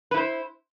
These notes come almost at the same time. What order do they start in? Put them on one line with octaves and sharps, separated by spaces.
B4 E4 C5